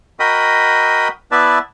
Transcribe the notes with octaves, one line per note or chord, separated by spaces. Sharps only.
F#4 A#4 D#5 G5 B5 D#6
B3 E4 B4 D5 E5 A5